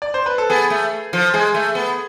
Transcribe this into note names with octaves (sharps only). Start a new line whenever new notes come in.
D5
C5
B4
A4
B3 G#4
A3
F3
G#3 G#4
A3
B3